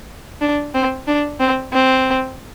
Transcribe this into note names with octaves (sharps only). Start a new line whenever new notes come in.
D4
C4
D4
C4
C4